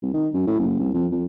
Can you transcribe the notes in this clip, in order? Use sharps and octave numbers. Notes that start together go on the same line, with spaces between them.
C2
D#3
F#2
A2
F#1
C2
F2
F2